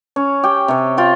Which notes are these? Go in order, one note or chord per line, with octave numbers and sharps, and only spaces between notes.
C#4
G4 G5
C3 C#5
F4 G5